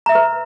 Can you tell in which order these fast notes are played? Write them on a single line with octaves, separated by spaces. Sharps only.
A#5 E5 E6 B4